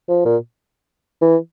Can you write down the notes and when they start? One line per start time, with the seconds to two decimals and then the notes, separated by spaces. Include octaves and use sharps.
0.09 F3
0.25 A#2
1.21 E3